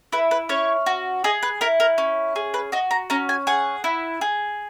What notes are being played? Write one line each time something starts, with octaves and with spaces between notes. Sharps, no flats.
E4 B4
B4
C#4 C#5
F#4
G#4 D#5
B4
E4 A#4
A#4
C#4
G#4
B4
F#4 D#5
A#5
C#4 A#5
G#5
G#4 F#5
E4
G#4